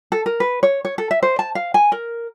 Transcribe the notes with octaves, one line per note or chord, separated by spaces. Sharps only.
A4
A#4
B4
C#5
C#5
A4
E5
C5
A5
F5
G#5
A#4